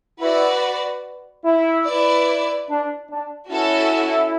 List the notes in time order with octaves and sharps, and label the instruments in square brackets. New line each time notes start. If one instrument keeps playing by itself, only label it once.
[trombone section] E4 [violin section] F#4 B4 D5
[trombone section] E4
[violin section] E4 B4 D5
[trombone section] D4
D4
[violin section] C#4 F#4 A4 [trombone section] E4